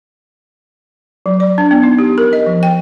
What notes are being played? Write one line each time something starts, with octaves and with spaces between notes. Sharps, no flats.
F#3
D5
D4
B3
D#4
G4
A#4
D#5
F3
G5